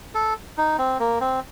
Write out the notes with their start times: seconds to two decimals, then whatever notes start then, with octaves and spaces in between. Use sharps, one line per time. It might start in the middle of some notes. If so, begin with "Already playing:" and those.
0.15 A4
0.57 D#4
0.78 C4
1.00 A#3
1.21 C4